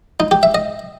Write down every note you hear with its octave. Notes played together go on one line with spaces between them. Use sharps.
D#4
G4
E5
D#5